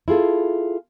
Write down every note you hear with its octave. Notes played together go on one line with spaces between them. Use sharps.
E4 F4 G#4 A4